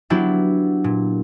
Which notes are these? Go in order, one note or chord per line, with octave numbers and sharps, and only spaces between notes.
F#3 B3 D4 E4 G4
A#2